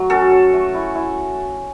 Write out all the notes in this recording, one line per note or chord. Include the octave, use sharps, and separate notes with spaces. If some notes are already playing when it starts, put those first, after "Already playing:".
Already playing: F#3 A3
C#4 F#4 A4
C#4
A3
E4
E4